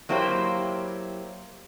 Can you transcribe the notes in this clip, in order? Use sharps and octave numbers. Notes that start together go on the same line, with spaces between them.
F#3 A#3 E4 G4 B4 C5